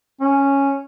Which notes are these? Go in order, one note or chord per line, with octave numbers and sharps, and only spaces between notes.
C#4